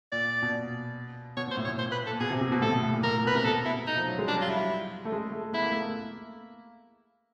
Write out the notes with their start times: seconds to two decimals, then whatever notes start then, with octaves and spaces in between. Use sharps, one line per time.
0.12 A#2 D5
0.43 B2
1.37 B2 C#5
1.47 A#2 C5
1.57 A2
1.65 C#5
1.68 A2
1.78 A#2 C5
1.92 B4
2.06 A4
2.11 A#2
2.20 B2 G#4
2.31 C3
2.41 C3
2.52 B2
2.62 A2 A4
2.73 A2
2.83 A2
2.93 A#2
3.04 A2 A#4
3.14 A#2
3.24 B2 B4
3.35 C3 A#4
3.45 B2 A4
3.66 B2 E4
3.87 D#4
3.97 F3
4.08 F#3
4.19 G#3
4.27 G3 D4
4.36 F#3
4.41 F4
4.47 G3 E4
5.05 A3
5.12 G#3
5.32 A3
5.53 B3 E4
5.62 A#3
5.72 A3
5.82 A#3